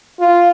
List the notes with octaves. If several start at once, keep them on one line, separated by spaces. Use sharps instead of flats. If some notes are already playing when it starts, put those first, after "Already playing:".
F4